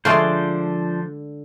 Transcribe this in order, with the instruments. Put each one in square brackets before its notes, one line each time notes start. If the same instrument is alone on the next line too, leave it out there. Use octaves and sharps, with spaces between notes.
[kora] D3 D5 [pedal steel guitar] F3 D4 C5 [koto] G#3 A3 F4